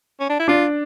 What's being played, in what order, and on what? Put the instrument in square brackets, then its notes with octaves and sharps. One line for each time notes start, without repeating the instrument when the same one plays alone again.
[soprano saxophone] C#4
D4
E4
[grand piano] D4 [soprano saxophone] F4